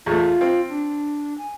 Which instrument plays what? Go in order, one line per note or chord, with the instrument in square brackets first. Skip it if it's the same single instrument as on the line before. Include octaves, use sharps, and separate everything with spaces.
[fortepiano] E2 A3 [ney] F4
[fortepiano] C4
[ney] D4
G#5